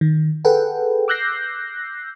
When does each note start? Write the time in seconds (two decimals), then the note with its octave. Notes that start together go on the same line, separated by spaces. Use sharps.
0.01 D#3
0.45 G#4 A4 B4 F#5 G5
1.08 D6 E6 F#6 G6 A#6 C7